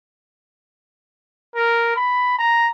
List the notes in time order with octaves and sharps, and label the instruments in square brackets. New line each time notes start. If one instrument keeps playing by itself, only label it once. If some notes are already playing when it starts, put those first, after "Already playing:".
[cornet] A#4
B5
A#5